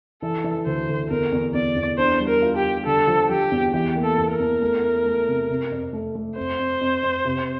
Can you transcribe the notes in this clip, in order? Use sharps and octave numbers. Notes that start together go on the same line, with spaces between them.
E3 A4
E3
D2 C5
D2
E2 A#4
E2
E2 D5
E2
D4 C5
G3
A#4
F4
G4
G3
D3 A4
F3
F3 G4
E2
E3 G4
A#3
A4
E2
A#4
E2
A3
A3
A3
C3
C3
F2
A3
A3
F2 C5
F2
F2
F2
C3